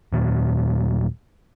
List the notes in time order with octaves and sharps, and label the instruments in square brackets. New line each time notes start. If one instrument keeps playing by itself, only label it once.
[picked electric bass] D#2 A#2 F#3